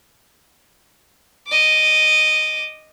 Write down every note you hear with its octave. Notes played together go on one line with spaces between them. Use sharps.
D#5 D6